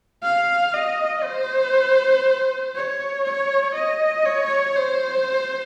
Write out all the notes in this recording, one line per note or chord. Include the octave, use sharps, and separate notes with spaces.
F5
D#5
C5
C#5
C#5
D#5
C#5
C5